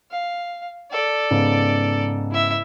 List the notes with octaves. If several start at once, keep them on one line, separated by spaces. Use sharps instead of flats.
F5
A4 D5
G#2 C#3 B3
E4 E5